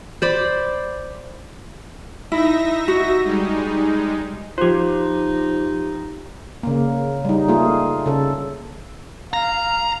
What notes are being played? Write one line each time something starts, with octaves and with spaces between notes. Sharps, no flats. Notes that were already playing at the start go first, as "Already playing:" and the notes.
C5 D5 B5
D#4 E4 E5 A#6
F#4
G3 G#3 D#4
F3 D#4 F4 G4 C5
C#3 A#3
G3 D#4
A3 A#3 F4 G#4
C#3 A4
F5 A#5